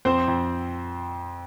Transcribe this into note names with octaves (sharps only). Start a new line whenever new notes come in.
F2 C4 C5
F2